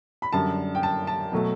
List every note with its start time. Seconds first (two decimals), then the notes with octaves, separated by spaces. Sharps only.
0.22 B5
0.32 F#2 D3 G3 A5
0.75 G5
0.83 A5
1.07 A5
1.32 B2 F#3 A3